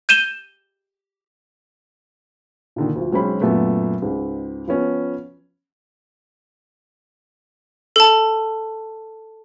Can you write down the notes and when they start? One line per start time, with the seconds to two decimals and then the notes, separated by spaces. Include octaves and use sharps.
0.09 G6 D#7 E7 G7
2.76 A#2 D3 D#3
2.95 D2 F3
3.12 B1 G#3 C4 C#4 C5 B5
3.41 F#2 A#2 F#3 A3 B3
4.02 C#2 G#2
4.67 F3 B3 C#4
7.96 A4 A5